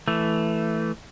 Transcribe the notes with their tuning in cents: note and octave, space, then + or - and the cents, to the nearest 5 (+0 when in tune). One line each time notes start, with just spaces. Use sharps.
E3 +0 A3 +0